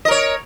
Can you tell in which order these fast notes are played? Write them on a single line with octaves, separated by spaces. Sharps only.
D#5 A#4 C#5